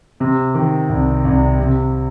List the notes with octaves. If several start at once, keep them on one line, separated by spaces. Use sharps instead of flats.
C3
D#3
C2
C2
C3